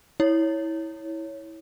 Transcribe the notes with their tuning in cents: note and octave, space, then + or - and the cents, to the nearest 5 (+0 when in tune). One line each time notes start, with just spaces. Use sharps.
E4 -20 C#5 +0